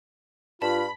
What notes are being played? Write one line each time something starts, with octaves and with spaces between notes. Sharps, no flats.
G2 F4 A5 B5